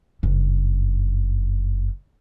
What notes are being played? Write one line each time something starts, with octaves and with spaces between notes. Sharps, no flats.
F#1 G2